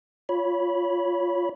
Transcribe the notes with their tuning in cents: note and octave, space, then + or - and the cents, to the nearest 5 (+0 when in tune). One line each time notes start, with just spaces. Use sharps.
F4 +0 C#5 +15 B5 -10